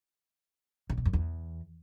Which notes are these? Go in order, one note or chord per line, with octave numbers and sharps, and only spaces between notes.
C#3
B2
F#2
E2